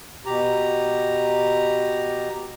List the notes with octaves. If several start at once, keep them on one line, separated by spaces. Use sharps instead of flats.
B2 G4 A#5